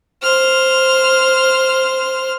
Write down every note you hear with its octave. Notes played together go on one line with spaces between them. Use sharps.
C5 F6